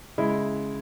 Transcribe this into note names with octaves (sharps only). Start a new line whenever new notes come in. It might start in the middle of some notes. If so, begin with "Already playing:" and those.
C#3 G#3 E4